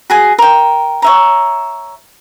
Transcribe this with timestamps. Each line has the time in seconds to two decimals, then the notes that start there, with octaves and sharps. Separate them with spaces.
0.10 F#4 G#4 G#5
0.38 A#4 G5
1.02 C#5 E5 A#5